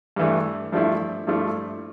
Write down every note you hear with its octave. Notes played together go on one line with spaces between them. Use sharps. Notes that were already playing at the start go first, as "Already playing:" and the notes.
G2 E3 A3
G2 F3 A3 E4
G2 F3 A3 E4